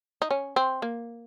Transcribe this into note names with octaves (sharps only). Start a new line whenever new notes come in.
D#4
C#4
C4
A#3